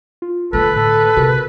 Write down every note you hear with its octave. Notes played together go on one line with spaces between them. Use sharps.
F4
D3 A3 A4 B4
A2 A4
C3 F#4 G4 A#4